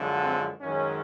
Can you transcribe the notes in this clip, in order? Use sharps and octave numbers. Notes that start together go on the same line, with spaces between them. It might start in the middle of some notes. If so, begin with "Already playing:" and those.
Already playing: F#2 D3 F3 G#3
C4
F#2 D#3 G#3 C#4